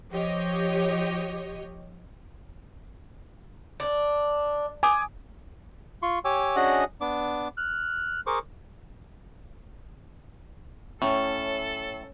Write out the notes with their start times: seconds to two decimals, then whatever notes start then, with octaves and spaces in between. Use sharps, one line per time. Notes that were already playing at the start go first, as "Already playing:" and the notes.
0.13 F3 G4 C#5 D#5
3.80 D4
4.83 G#5 D6 D#6
6.03 F4 C6 C#6
6.25 G4 C#5 G#5 D6 E6
6.56 C#4 D4 F#4 G#4 D#5 F#5
7.01 B3 D4 D6
7.57 F6 F#6
8.27 G#4 A#4 C5 C#6 D6
11.02 A2 C#4 A4